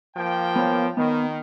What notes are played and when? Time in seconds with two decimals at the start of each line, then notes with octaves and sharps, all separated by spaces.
0.16 F3 A#3 G5
0.56 B3 A#4 C#5
0.97 D#3 B3